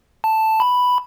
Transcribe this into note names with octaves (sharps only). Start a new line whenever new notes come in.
A5
B5